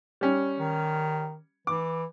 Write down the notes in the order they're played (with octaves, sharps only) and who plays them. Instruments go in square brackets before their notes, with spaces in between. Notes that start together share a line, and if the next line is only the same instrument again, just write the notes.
[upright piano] G3 C#4
[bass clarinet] D#3
[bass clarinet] E3 [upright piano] D6